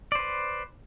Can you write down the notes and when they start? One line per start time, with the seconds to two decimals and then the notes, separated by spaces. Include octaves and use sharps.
0.12 D5
0.15 C5
0.19 B4